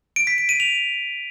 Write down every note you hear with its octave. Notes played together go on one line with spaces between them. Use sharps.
D7
B6
D7
D#7
F7